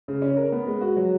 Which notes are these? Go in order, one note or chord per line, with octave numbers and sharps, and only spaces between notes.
C#3
C#4
A#4
B3
G#3
F#4
F#3